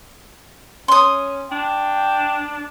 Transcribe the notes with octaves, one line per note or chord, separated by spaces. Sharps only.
C#4 C6 D#6
D4 G5